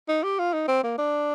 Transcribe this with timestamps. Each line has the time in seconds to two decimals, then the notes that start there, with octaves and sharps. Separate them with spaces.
0.08 D#4
0.24 G4
0.39 F4
0.54 D#4
0.68 C4
0.84 A#3
0.98 D4